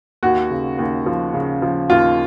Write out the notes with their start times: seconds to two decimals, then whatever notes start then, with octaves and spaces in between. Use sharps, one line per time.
0.23 D#2 F#4
0.50 C#3
0.79 D#2
1.06 F3
1.34 C#3
1.62 F3
1.90 D#2 F4